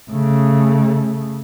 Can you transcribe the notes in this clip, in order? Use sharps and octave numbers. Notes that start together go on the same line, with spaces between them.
C#3 A3